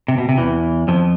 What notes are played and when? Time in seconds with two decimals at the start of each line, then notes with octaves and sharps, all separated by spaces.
0.08 C3
0.18 B2
0.29 C3
0.38 E2 E3
0.88 F2 F3